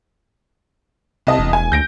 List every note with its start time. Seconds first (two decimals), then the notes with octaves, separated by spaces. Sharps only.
1.27 C2 C3 D#5 A5
1.39 E1
1.53 G#5
1.72 D2 G6 A#6 D7